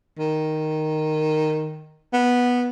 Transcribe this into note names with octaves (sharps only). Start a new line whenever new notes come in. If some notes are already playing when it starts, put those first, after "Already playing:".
D#3
B3